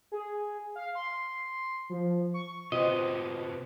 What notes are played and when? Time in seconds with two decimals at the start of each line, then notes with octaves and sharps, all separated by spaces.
0.12 G#4
0.75 F5
0.95 C6
1.90 F3
2.34 C#6
2.72 C3 B3 F4 C5 D#5 G5 C6